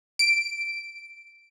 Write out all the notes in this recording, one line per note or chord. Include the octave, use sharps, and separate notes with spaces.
D7